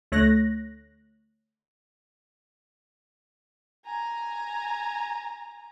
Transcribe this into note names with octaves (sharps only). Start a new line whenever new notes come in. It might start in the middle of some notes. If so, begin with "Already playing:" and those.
D2 A3 C#5 F#6 A#6
G#5 A#5